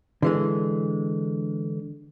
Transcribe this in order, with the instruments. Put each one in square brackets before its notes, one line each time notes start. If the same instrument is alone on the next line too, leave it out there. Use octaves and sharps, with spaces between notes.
[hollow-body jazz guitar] D3 E3 G#3